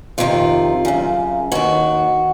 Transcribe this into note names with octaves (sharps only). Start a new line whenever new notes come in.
F2 C3 D#3 F4
F#2 C#3
D#2 D#3 F#4